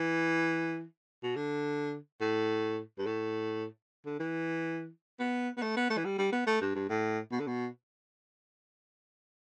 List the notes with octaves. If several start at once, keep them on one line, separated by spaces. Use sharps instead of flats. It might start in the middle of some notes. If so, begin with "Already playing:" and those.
Already playing: E3
B2
D3
A2
G2
A2
D3
E3
B3
B3
A3
B3
A3
E3
G3
G3
B3
A3
G2
G2
A2
B2
D3
B2